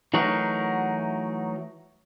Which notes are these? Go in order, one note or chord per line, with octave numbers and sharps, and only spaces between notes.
E3 F#3 A3 D#4 F#4 A#4